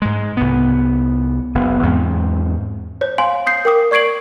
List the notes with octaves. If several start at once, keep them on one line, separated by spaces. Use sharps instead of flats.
G#2 G#3
C2 B3
F#1 B3
E2 G#2 C4
C5 C#5
F5 G#5 C6
D#6 G6 C7
A#4 G5 D6 D#6
D5 C#6 G#6 C7 D7 F#7